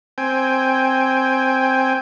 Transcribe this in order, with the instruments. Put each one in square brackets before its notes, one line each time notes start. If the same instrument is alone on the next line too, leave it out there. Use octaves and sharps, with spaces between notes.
[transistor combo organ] C4 G5 G#5